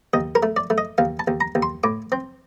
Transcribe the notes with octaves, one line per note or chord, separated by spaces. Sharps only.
D#2 D#5
A#4
A3
D5
A3
D#5
D#2 F5
A5
D#2
A#5
D#2
C6
A2 D6
C4